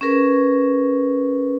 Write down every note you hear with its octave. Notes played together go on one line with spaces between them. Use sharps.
C#4 G#4 A#4 B4